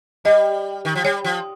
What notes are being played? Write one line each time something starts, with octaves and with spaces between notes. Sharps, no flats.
G3 D#5
D#3
F3
G3 C#5
F3